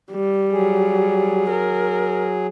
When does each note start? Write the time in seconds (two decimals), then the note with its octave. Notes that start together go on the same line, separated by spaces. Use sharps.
0.12 G3
0.52 F#3 G#4
1.50 A#4